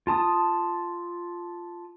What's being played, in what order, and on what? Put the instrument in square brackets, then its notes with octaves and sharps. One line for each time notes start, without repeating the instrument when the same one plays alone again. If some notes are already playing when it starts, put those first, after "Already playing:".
[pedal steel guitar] F4 A5 D#6